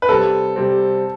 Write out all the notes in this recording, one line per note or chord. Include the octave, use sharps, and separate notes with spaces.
B4
C3 G3 C4 A4
C3 G3 C4